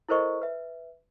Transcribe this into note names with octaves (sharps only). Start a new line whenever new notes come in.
E4 A4 A#4 C5 D#5 C#6
B4 E5